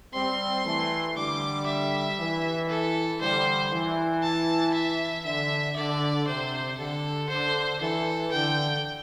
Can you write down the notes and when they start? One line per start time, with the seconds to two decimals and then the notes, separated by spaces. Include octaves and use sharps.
0.14 G3 C4 C6
0.65 E3 A3
1.17 D3 G3 D6
1.67 E5
2.18 E3
2.70 A4
3.21 D3 G3 C5
3.72 E3
4.23 A5
4.74 E5
5.25 D3 E5
5.77 D3 D5
6.27 C3 C5
6.79 D3 A4
7.29 D3 C5
7.81 E3 A4
8.32 D3 G5